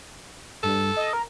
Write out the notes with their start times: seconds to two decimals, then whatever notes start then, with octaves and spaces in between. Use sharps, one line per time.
0.63 G2 A4
0.96 D#5
1.13 A#4